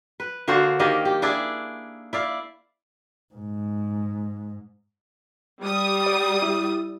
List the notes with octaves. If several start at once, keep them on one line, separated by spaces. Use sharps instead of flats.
B4
D3 A#3 F#4 C5
D#3 A#3 G4 D#5
G4
D4 E4 G#4 D5
E4 D5 F5
G#2
G3 D#6
D5
E4